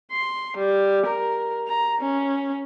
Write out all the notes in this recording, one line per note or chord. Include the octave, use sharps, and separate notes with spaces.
C6
G3
A#4
A#5
C#4